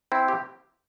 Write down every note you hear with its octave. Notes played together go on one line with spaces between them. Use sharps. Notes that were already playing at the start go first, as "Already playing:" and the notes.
C4 E4
G4